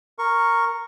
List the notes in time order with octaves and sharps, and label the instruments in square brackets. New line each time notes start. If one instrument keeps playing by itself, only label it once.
[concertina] A#4 C#6